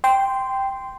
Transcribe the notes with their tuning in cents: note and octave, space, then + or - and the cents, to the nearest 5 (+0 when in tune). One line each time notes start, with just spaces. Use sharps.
G5 +0 C6 -15